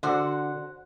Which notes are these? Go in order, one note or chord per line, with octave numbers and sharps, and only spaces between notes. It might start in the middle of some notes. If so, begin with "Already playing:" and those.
D3 F#4 C5 F#5